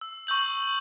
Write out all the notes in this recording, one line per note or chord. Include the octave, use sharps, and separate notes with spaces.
E6
C#6 E6 G6 F#7